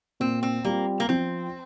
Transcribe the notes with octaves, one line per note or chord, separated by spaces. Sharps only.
A#2 C4
C4
G3 A#3 C4 F4
A#3
F3 C4